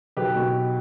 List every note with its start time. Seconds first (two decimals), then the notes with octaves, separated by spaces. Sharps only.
0.17 B1 G4 B4
0.36 B2